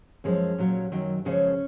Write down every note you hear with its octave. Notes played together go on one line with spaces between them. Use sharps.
F#2 F3 G#3 C#4
A#2 F#3
F#2 D#3 F#3
F#2 C#3 F3 G#3 C#4